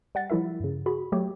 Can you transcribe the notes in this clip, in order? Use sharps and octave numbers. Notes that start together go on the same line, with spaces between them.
G3 F#5 A6
F3 G3 E4 A#4 E5
G2 C#3
F#4 G#4 B5
F#3 A3 G4 C#5